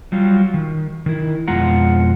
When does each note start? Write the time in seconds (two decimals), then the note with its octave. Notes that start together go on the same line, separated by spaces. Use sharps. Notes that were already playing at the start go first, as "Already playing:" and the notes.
0.12 F#3 G3 F4
0.54 D#3
1.06 D#3 E4
1.48 F2 B2 G#3 F4 F#5 A#5